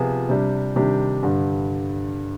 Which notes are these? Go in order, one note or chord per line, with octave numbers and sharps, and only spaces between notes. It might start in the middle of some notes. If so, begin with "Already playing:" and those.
Already playing: C3 F3 B3 F4 G#4
C3 G3 D4
C3 D#3 G3 D4 G4
G2 D3 G3